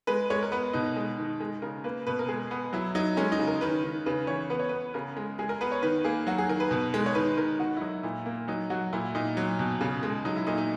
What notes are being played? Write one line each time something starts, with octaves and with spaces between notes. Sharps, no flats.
G#3 B4
G#3 C#5
A#4
B3 B4
B2 D#4
G#3
D#3
G#3
C#3 A#4
A#3 B4
B2 B4
A#4
G#3 G#4
B3
F#3 E4
F#3 D#4
G#3 C#4
D#4
C#3
A#4
D#3 B4
D#3
C#3 B4
E3 C#5
B3 B4
C#5
B3 B4
C#3 A#4
G#3
G#3 G#4
A#4
B3 B4
C#5
D#3 B4
A#3 G#4
F#3 F#4
G#4
D#3 A#4
B4
B2
G#3
C#5
D#3 B4
D#3 A#4
D#3 F#4
E4
F#3 D#4
A#2 E4
A#3
F#3 D#4
F#3 F#4
A#2 E4
A#2 D#4
F#3
B2
C#3
G#3
F#3 D#4
E4
A#2 D#4
D#4